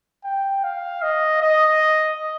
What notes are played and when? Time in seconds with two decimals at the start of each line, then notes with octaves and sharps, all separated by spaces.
0.24 G5
0.64 F5
1.03 D#5
1.42 D#5